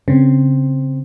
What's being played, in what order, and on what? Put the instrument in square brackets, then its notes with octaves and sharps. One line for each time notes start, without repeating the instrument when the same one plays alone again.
[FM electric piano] C#3 [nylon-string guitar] C4